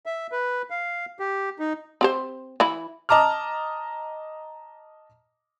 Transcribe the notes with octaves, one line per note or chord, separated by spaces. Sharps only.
E5
B4
F5
G4
D#4
C4 G4 C5
E3 E4
D#5 A5 A#5 D6 F6